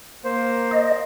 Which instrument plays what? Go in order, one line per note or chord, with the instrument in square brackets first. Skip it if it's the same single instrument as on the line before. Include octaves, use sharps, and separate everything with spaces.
[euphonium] A#3 [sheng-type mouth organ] C5
[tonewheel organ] D#5